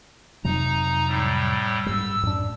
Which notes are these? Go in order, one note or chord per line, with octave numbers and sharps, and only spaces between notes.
F2 C3 F#3 D#4 A#5
A2 G3
G#2 G3 E6
F#2 A2 D4